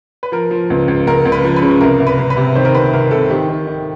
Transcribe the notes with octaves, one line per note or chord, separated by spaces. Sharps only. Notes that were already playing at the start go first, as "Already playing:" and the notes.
B4
F3 A#4
F3
C#2
C#2
C#2 A#4
C#2
B4
F3
B4
C#3
C2 A#4
C2
B4
C2
B4
C3
D#3 C5
A#4
C3 B4
C2 A#4
C2 A4
D#3 G4
D#3
D#3